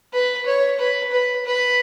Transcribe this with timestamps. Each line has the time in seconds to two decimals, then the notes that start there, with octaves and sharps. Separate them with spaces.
0.13 B4
0.46 C#5
0.79 B4
1.12 B4
1.45 B4